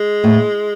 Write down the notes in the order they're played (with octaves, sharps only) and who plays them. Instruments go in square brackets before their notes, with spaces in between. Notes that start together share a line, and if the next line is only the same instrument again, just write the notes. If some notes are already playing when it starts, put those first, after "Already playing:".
Already playing: [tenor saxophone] G#3
[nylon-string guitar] A2